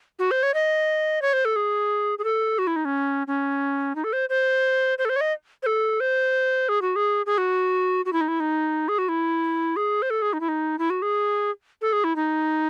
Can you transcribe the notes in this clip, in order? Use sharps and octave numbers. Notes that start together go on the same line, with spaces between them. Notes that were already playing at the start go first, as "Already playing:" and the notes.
F#4
C5
C#5
D#5
C#5
C5
A4
G#4
G#4
A4
F#4
E4
D#4
C#4
C#4
D#4
A4
C5
C5
C5
A4
C5
C#5
D#5
C5
A4
C5
G#4
F#4
G#4
G#4
F#4
F#4
E4
D#4
E4
D#4
G#4
F#4
E4
G#4
C5
A4
G#4
D#4
E4
D#4
E4
F#4
G#4
A4
G#4
E4
D#4